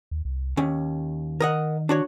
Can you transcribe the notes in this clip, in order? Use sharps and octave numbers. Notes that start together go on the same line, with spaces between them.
D#2
C2
D#2 D#3 C#4
A#4 D#5 F#5
D4 F#4 C#5